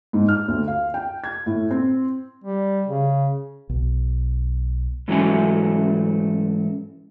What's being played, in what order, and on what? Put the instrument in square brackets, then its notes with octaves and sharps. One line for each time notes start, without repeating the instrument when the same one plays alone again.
[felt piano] G#2
F6
D2
F5
G5
G#6
A2
C4
[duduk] G3
C#3
[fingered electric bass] B1
[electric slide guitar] G#2 E3 F#3 A3 C#4 G#5